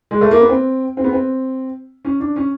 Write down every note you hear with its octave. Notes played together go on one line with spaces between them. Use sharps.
G#3
A3
A#3
B3
C4
C4
B3
C4
C#4
D4
C#4